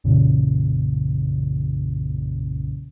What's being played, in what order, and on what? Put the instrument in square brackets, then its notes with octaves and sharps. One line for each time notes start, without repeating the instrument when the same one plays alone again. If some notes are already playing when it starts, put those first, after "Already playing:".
[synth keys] B1 F#2 A#2 C#3 E3